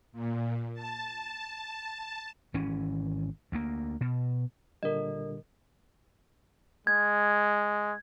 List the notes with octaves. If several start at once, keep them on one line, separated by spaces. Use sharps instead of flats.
A#2
A5
G#1 E3 C#4
D2 A#3
B2
A#2 D3 G3 A#4 D#5
G#3 G#6